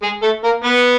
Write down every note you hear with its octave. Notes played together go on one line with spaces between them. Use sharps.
G#3 G#4
A3 A4
A#3 A#4
B3 B4